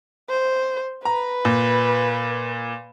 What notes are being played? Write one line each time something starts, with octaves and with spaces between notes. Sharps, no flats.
C5
B4 A#5
A#2